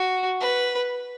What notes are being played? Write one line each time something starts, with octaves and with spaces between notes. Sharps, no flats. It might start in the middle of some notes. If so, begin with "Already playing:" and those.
Already playing: F#4
B4